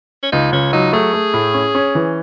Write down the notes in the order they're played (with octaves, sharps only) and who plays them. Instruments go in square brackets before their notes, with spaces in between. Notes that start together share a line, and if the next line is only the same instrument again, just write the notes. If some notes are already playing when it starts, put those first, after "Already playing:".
[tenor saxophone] C#4
[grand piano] C#2 [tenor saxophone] D#4
[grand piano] C#2 [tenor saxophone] C#4
[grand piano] F#3 [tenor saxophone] D#4
[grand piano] A3 [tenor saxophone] G#4
[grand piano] A3
A2
C#4
C#4
E3